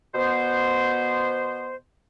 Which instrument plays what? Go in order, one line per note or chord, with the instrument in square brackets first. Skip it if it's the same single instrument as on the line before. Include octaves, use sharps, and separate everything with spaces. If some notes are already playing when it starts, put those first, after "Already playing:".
[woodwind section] B2 B3 C5